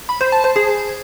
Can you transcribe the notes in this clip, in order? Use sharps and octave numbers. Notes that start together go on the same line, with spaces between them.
B5
C5
A5
C5
G#4